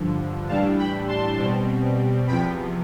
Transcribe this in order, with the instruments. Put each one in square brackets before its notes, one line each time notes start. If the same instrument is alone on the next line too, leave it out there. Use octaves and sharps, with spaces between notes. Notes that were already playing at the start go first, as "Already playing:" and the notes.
Already playing: [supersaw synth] G2 D3 F3
A2 E3 G3 D4 F5 A5
G5 B5
A5 C6
B2 G3 C4
E2 C3 F3 G5 B5